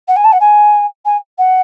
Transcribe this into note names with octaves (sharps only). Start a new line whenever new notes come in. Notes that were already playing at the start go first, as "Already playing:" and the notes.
F#5
G#5
A5
F#5
G#5
G#5
F#5